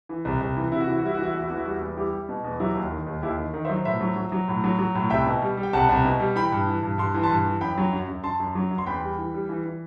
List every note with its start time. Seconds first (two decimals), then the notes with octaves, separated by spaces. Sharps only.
0.09 E3
0.25 C2
0.41 C2
0.57 E3
0.72 C3 E4
0.80 F#4
0.88 E3 E4
0.97 F#4
1.03 G3 E4
1.14 F#4
1.18 E3
1.23 E4
1.31 F#4
1.35 E2 E4
1.48 E2 F#4
1.56 E4
1.65 G3 F#4
1.73 E4
1.81 E2
1.97 G3 E4 G4
2.13 G3
2.29 B2
2.44 E2
2.60 F#3 E4 G4
2.75 D#2
2.92 D#3
3.07 D#2
3.22 D#2 E4 G4
3.38 D#3
3.54 D#3
3.65 C5 E5
3.70 F#3
3.85 A2 C5 E5
4.01 F#3
4.16 F#3
4.32 F#3
4.48 A2
4.64 F#3
4.79 F#3
4.95 A2
5.10 C2 E5 G5
5.26 B2
5.42 G3
5.57 G3
5.63 G5
5.73 C2 F#5 A5
5.89 C2
6.05 B2
6.20 G3
6.36 E3 G5 B5
6.52 G2
6.67 E3
6.83 G2
6.98 G2 C6
7.14 E3
7.23 A5 C6
7.30 G2
7.46 E3
7.61 F#2 G5 B5
7.78 F#3
7.93 F#2
8.08 F#2
8.24 F#2 A5 C6
8.40 F#2
8.55 F#3
8.71 F#2
8.78 C6
8.87 E2 G5 B5
9.03 G3
9.18 E3
9.34 G3
9.49 E3
9.66 E3